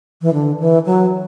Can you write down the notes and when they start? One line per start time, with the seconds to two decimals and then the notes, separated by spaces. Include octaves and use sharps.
0.22 E3
0.33 D3
0.60 E3
0.86 F#3